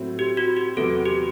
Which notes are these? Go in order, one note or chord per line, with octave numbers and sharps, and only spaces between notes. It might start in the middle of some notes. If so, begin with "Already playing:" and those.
Already playing: A2 F#3 C4 E4
G4
F#4
G4
E2 C3 F#3 B3 A4
G4